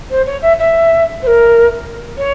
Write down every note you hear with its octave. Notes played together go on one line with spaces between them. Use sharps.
C5
C#5
E5
E5
C5
A#4
C#5